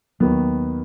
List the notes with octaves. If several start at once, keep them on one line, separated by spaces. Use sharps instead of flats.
D#2 D#3 F#3 B3